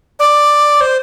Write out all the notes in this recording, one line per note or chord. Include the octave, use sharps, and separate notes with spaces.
D5
C5